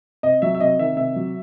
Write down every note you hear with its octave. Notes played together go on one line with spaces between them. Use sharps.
C3 D#5
F#3 E5
E5
C3 D#5
D#3 E5
C3 E5
F#3